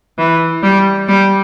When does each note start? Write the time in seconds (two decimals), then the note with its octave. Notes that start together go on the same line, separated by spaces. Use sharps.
0.18 E3
0.63 G3
1.08 G3